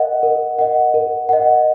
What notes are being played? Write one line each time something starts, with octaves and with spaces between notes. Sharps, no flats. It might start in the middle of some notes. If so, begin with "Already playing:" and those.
Already playing: A#4 D#5 F#5
A#4
D#5 F#5
A#4
D#5 F#5